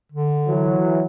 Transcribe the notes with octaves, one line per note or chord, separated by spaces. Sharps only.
D3
E3 F#3